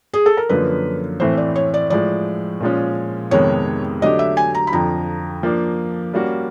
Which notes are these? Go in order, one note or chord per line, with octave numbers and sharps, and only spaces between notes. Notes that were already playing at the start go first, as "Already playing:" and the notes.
G#4
A4
A#4
F#2 D3 F3 A#3 B4
A2 E3 A3 C4 C5
D5
C#5
D5
A2 F3 G#3 D5
A#2 F3 G#3 C#4
F2 C3 D#3 G#3 B3 C#5
D3 F#3 A3 D4 G4 D#5
E5
G#5
A#5
B5
F2 D3 F3 A#5
F3 A#3 D4
G3 A#3 C#4 F#4